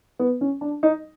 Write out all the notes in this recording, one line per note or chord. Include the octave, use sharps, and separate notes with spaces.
B3
C#4
D4
D#4